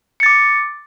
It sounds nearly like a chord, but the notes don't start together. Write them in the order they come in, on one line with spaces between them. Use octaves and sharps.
C#7 A6 D6